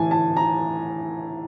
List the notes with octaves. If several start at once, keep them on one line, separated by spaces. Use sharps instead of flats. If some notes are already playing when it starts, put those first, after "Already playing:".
Already playing: A2 E3 G#5 A5
A5
A#5